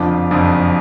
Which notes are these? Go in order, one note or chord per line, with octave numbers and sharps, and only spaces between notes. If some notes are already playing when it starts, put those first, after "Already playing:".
Already playing: F#1 F2 D3 F3 D6
F#1 F2 D3 F3